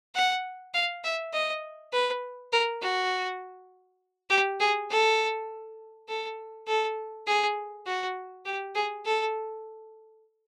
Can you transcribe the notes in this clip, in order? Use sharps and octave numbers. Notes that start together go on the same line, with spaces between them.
F#5
F5
E5
D#5
B4
A#4
F#4
G4
G#4
A4
A4
A4
G#4
F#4
G4
G#4
A4